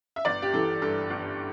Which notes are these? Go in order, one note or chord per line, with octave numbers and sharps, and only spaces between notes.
E5
G1 D5
G4
E3 A4
G2 A4
G1